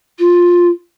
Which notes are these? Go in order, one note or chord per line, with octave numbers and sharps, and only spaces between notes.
F4